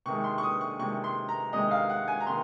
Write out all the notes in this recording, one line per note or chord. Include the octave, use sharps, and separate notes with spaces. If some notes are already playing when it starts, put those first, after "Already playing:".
C3 D#3 G#3 C#6
C6
C#6
D#6
C#6
C3 D#3 G#3 C#6
C6
A#5
C3 D#3 G#3 D#5
F5
F#5
G#5
A#5
C3 D#3 C6